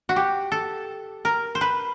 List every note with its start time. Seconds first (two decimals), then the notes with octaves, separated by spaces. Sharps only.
0.09 F#4
0.16 G4
0.52 A4
1.25 A#4
1.55 C5
1.61 B4